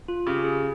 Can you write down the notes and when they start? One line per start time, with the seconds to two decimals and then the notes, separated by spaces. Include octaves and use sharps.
0.08 F4
0.27 C#3 G4
0.44 G#4